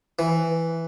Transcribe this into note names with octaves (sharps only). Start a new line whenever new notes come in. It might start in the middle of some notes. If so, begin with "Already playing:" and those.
E3